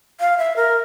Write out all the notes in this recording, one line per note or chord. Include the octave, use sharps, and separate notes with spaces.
F5
E5
A#4